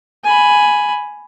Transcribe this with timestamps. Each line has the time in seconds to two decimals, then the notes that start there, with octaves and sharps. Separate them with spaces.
0.24 G#5 B5